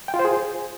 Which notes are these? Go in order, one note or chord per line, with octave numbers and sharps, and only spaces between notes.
G5
F4
C5
G#4